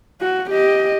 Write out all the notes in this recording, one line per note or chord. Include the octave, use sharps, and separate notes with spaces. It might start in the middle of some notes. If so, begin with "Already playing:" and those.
F#4
G4 D#5